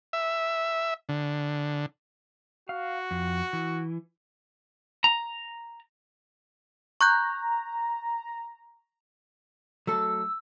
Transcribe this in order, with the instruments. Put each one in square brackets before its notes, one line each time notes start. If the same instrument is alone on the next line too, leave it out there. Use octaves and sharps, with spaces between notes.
[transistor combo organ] E5
D3
[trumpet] F#4 [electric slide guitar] F5
[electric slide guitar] F2
E3
[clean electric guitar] A#5
[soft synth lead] A#5 [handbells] C#6 F#6 G6
[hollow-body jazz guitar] F#3 A3 A4 [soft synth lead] E6